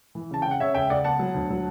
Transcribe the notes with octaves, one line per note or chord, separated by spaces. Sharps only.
E3
C#3 A5
C#3 G5
F#5
C#3 C#5 E5
C#2 E5 G5
C#2 D5 F#5
B3 F#5 A5
F#3
D2
F#3